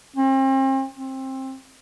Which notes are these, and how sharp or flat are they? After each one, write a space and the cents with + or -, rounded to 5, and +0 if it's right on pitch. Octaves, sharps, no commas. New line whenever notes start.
C4 +40
C4 +20